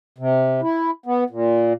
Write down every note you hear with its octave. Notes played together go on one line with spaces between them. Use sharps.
C3
E4
B3
A#2